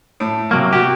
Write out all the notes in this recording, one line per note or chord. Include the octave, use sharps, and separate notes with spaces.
A2
C3 F#3 A#3
F#4 G4